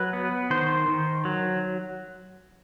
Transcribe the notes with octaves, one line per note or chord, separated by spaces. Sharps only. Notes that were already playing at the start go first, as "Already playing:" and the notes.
Already playing: F#3 B4
B3
D#3 C5
D#3
F#3